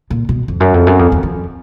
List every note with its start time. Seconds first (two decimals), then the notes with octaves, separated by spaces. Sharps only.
0.10 A#2
0.29 B2
0.48 F2
0.60 F#2
0.74 F2
0.87 F#2
0.99 F2
1.12 E2
1.23 F2